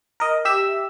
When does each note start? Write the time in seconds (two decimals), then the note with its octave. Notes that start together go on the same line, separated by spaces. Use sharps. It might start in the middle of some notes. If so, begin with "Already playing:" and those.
0.20 A#4 D#5
0.45 G4 E5 E6